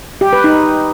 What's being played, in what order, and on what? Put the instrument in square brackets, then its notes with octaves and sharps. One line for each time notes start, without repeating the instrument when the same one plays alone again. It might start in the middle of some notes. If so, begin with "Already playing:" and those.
[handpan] G4
B4
D#4